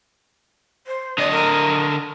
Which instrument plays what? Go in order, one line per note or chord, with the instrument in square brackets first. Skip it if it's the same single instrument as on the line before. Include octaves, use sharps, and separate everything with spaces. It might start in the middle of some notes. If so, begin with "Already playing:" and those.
[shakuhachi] C5
[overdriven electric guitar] D3 D#5 [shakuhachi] D5
[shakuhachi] A#4